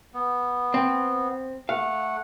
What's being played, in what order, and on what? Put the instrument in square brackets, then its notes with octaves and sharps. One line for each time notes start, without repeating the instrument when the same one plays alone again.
[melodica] B3
[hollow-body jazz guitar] C4
[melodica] A3 F#5 [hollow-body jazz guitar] F5